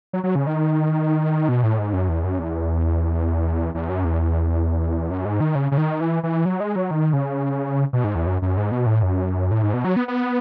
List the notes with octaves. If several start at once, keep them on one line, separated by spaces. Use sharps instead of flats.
F#3
F#3
C#3
D#3
B2
A2
G#2
F#2
E2
F#2
E2
E2
F#2
E2
F#2
G#2
D#3
C#3
C#3
D#3
E3
E3
F#3
G#3
F#3
D#3
C#3
B2
G#2
E2
F#2
F#2
G#2
B2
A2
F#2
A2
G#2
B2
F#3
B3
B3